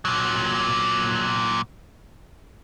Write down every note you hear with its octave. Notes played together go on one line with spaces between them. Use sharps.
A#2 F#3